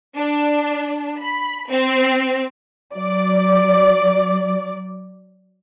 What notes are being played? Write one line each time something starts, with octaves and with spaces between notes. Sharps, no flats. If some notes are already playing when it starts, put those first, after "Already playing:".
D4
B5
C4
F#3 D5